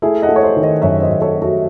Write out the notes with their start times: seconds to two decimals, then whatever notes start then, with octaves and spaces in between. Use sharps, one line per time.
0.02 A3 E4 G#4
0.22 D#5 F#5
0.29 A3
0.36 C#5
0.43 C5 D#5
0.56 D#3
0.63 C5 D#5
0.82 F#2 C#5 E5
1.02 C5 D#5
1.09 F#2
1.22 A4 C#5
1.36 A3
1.42 F#4 A4